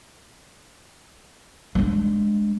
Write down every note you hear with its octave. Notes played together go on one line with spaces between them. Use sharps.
G#3 D4